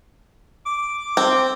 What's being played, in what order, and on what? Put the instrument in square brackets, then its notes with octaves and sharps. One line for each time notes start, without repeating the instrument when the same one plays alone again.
[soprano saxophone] D6
[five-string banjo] C4